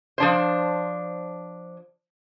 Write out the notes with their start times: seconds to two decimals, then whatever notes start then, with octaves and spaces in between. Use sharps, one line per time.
0.18 F3 D4 C5